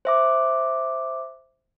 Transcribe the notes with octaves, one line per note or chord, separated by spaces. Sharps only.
C5 E5 D6